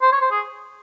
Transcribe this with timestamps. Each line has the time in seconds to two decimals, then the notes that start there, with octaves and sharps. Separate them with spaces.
0.02 C5
0.12 C#5
0.21 C5
0.31 G#4